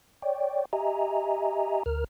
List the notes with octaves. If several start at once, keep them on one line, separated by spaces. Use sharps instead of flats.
C#5 D5 G5
G4 D#5 E5 G#5 A#5
D2 A#4 F6